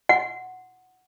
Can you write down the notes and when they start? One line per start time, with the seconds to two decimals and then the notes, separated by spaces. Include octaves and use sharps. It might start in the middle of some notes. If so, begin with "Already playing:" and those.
0.09 F#5